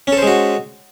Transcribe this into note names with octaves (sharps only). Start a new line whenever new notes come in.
G#3 C#4 F#4 A4 C5